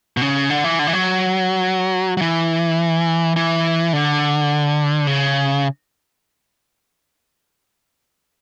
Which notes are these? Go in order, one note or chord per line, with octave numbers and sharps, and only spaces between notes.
B2
C#3
D3
E3
D3
E3
F#3
F#3
E3
E3
D3
C#3